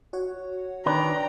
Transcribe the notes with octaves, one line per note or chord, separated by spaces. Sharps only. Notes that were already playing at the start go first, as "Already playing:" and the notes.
F#4 C#5 F#5
D#3 D4 B4 G5 A#5